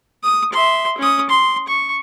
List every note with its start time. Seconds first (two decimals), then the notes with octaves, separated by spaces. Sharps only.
0.23 D#6
0.53 E5 C6
0.98 C#4 D#6
1.30 C6
1.68 C#6